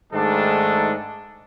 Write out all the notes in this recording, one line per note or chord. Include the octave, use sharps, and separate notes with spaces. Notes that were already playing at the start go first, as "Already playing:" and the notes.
G#2 D#3 G#3 A3 D4 A4